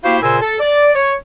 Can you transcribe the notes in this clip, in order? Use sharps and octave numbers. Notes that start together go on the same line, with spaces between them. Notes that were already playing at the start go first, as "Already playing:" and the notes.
A#3 E4 F#4 G4 C5 F5
A#2 C#3 A#4 C5 G#5 E6
A4
D5
C#5